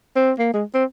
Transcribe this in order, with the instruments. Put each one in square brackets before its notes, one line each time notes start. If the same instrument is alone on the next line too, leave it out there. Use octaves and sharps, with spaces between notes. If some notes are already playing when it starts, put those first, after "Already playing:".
[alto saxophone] C4
A#3
G#3
C4